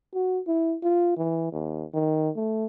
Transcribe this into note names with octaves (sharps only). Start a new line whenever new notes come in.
F#4
E4
F4
E3
D#2
D#3
A3